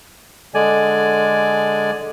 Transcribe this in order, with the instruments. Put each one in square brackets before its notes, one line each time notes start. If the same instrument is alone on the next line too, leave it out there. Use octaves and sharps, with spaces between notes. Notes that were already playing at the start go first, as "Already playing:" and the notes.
[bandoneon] D3 G#3 D5 G#5